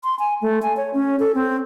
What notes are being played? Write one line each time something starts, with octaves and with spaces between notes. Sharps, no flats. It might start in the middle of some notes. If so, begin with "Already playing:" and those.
C6
G#5
A3
G#5
C#5
C#4
A4
C4